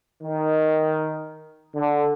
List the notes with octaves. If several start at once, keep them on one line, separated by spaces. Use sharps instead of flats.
D#3
D3